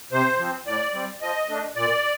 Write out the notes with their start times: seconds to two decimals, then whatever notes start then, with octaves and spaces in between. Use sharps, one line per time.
0.12 C3 C5
0.39 F3 C4
0.66 A2 D5
0.93 G3 C4
1.21 F3 D#5
1.48 A3 D4
1.75 A#2 D5